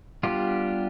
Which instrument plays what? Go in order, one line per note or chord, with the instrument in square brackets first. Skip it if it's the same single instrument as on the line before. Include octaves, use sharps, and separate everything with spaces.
[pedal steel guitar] G3 B3 D4 F4 G4